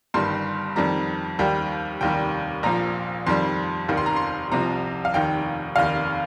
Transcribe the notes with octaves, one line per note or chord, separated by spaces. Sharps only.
G1 G2 D#3 G3 C6
F2 D#3 G3 A#5
D#2 D#3 G3 G5
F1 D#2 D#3 G3 G5
A#1 A#2 F3 A#5
F2 D#3 G3 C6
F1 D#2 D#3
C6
A#5
C6
C2 C3 F3 A#5
F5
F1 D#2 D#3 G5
F1 D#2 D#3 F5